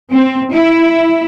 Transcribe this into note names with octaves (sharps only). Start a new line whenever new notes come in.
C4
E4